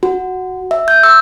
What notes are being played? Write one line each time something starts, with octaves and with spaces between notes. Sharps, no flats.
F#4
E5
G6
E6